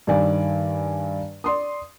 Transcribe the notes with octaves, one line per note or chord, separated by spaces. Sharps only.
G2 D#3 D5 G#5
D5 C6 D#6